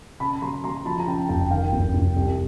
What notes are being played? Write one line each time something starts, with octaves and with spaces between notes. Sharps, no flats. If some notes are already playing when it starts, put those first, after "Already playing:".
C#3 A5 B5
F#3 A#5 C6
F#3 A#5 C6
F3 A5 B5
A#5
C#3 G5 A5
F1 G5 A5
D#3 F5 G5
F1
F1
C2